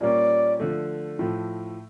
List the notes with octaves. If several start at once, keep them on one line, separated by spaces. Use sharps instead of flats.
A#2 G3 A#3 C#4 D5
D3 F3 A3
A2 F3 A3